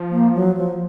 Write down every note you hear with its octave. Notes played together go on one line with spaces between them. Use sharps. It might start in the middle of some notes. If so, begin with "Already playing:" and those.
Already playing: F3
A#3
F#3
F3